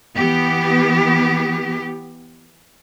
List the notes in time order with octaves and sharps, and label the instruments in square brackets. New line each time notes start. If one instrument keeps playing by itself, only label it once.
[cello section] E3 B3 G4